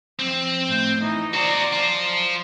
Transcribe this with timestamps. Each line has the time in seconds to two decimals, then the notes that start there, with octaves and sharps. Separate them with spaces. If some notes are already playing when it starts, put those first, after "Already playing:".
0.19 F3 C4
0.66 A2 G6
0.97 E3 D#4
1.33 F#4 C5 D5 A#5
1.73 F4 C5